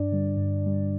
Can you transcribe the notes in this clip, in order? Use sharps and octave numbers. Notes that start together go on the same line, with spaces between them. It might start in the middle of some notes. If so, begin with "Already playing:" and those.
Already playing: G2 D4 D5
D3 G3
G2
D3 G3